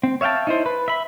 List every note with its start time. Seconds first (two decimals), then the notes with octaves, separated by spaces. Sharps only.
0.03 C4
0.21 C#5 E5 F5 G5 A5
0.47 D#4 E4 C5
0.66 B4
0.88 E5 B5